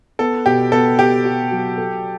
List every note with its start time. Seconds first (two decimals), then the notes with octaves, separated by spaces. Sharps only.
0.19 B3 A4
0.46 B2 G4
0.72 B3 A4
0.98 B3 G4
1.24 F#4
1.51 F#3
1.77 A4